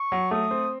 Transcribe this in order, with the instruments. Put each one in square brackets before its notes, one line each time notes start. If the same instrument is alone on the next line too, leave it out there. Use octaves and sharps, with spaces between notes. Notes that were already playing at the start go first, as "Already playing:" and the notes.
Already playing: [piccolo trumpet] C#6
[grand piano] F#3
[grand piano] A3 [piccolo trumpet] D#6
[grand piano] C4